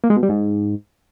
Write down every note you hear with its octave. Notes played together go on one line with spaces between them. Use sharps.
A#3
G#3
B2
G3
G#2